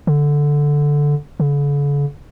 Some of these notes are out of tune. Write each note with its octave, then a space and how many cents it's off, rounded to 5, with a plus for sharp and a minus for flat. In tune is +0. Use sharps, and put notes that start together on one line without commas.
D3 -5
D3 -45